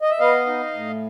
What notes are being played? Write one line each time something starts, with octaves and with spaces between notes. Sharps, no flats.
D#5
E5
B3 D#5 F5
D#4
A2